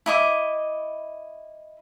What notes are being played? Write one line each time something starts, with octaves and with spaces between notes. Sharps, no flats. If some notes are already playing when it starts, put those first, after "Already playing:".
E4 D#5 D6